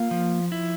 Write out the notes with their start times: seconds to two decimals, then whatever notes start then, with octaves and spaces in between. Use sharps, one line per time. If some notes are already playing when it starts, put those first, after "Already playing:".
Already playing: A#3 F4
0.11 F3
0.52 E4